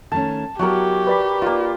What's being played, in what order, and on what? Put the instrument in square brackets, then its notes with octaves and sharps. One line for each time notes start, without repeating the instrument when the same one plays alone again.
[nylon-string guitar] D#3 A3 C#4 [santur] A5
[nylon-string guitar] F#3 B3 E4 [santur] F#4 A#4 [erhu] G4
[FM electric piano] B4 D5 B5
[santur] A#3 F4 [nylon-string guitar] D#4